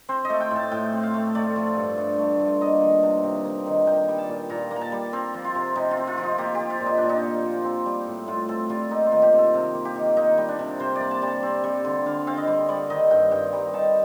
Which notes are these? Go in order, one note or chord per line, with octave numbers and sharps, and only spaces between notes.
C4 C5
D#5
A3
G5
A2
A5
A2 G5
C4
F5
A3
A3 D5
F3
G2
G2
A3
F3
A#3 D#5
D#3
C3
C3
A#3
D#3
A#3 G5
G3
A5
A#2
A#2 A#5
A#3
A#5
A5
G3
C4 A#4
F3
F4
C3
C3 D#4
F4
C4
F4
F3
D#4
A#3 G4
G4
F3
F4
A#2
D#4
A#2 D4
D#4
A#3
F3
C4
G3
A2
A2 F4
C4 A4
G3 F4
A#3 D#4
F4
D#3
G4
C3
A4
C3 A#4
A#3
G4
D#3
A#3 D#4
G3
D4
C3
C3 C5
A#3 D5
A5
G3
A5
C4
G3
D3
D3 F5
C4 F5
D#5
G3
G3 D5
D#3 D#5
G2 G5
G2 G5
G3 A#5
D#3 A5